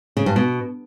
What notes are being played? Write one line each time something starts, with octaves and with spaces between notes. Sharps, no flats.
C#3
G2
B2